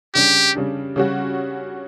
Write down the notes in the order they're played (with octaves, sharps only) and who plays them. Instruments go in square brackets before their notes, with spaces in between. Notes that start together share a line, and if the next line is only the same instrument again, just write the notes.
[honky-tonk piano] C#3 G3 D4 [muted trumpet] G4
[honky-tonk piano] C#3 G3 D4
C#3 G3 C#4 F#4